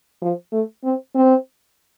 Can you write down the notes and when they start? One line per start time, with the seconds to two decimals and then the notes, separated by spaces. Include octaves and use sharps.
0.22 F3
0.52 A3
0.84 C4
1.15 C4